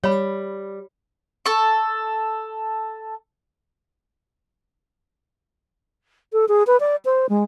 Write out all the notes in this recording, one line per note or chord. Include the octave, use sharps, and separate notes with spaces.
G3 C#5 B5
A4 C#6
A4
G#4
B4
D5
C5
G#3